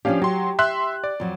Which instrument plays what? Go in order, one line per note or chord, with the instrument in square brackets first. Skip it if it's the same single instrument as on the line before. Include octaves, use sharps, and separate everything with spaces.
[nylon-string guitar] F3 C#4 D4 [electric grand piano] G4 F5
[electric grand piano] F#3 C6 [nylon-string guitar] G4
[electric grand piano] E5 C6 F#6
D5
[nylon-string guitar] F2 F#3